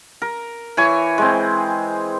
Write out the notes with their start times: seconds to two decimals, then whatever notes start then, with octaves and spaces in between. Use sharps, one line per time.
0.22 A#4
0.77 E3 C#5 G#5
1.18 G#3 C4